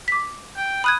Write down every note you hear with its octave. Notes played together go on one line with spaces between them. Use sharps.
D6 B6
G5
B5 D#6 F#6 G#6